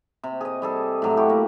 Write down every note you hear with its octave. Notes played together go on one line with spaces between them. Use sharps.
C3
G#4 D#5
G3 G#4 A4
A2 F#3 A3
E4 F#4 G4
A#3